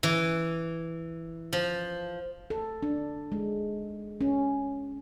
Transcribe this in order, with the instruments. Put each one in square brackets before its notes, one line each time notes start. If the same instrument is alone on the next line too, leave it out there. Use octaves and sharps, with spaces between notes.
[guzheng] E3
F3
[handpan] A4
D4
G#3
C#4